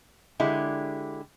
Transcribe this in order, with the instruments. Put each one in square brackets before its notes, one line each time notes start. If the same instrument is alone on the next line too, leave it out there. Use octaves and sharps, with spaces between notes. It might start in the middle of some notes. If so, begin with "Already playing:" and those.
[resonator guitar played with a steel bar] D3 G#3 E4 G4